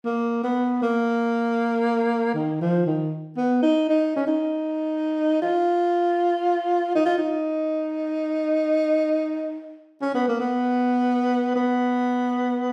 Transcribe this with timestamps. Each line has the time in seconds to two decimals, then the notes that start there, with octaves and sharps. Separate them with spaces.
0.05 A#3
0.44 B3
0.82 A#3
2.35 D#3
2.61 F3
2.86 D#3
3.37 B3
3.62 D#4
3.89 D#4
4.16 C#4
4.27 D#4
5.42 F4
6.95 D#4
7.06 F4
7.17 D#4
10.02 C#4
10.15 B3
10.28 A#3
10.40 B3
11.55 B3